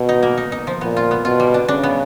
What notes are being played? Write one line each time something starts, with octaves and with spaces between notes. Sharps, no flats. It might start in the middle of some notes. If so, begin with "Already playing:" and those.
Already playing: B2
D#4
A#3
D#4
D#4
F3
A#2 B3
F4
B3
B2 F4
G3
D4
C#3 D4
B3